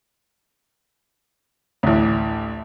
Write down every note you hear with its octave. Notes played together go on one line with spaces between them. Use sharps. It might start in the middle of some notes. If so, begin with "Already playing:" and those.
A1 D2